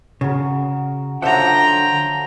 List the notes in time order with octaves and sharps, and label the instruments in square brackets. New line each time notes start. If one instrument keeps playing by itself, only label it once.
[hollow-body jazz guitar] C#3 [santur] F#4 A#4
[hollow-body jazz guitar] D3 E5 F#5 [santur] F3 F#3 [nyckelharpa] G5 A#5